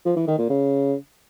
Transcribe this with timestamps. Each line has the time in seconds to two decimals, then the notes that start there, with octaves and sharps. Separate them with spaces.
0.05 F3
0.16 E3
0.27 D#3
0.38 A#2
0.49 C#3